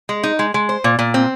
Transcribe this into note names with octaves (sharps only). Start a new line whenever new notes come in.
G#3
D#4
G#3
G#3
C5
A#2
A#2
C4